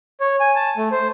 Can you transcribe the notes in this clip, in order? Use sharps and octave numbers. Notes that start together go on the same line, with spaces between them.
C#5
G#5
A5
A3
C5